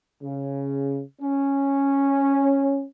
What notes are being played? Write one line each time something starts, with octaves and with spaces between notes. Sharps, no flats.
C#3
C#4